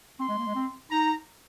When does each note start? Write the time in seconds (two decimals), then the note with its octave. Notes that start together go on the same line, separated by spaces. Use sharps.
0.20 C4 C6
0.28 G#3
0.38 A#3
0.47 G#3
0.55 C4
0.91 D#4 A#5